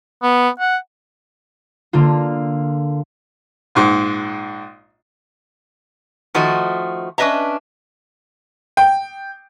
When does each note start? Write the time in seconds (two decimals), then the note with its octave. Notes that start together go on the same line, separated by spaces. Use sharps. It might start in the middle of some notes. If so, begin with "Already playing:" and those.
0.22 B3
0.59 F#5
1.93 D3 A#3 F4
3.75 A#1 G#2
6.35 D#3 F3 A3 F#4 D#5
7.18 C#4 D4 B4 D#5 E5 A#5
8.77 G5